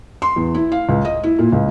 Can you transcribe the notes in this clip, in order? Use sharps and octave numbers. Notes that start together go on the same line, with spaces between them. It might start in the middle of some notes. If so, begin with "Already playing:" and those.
C6
E2
E4
F5
C#2
D#5
E4
A#2
C#2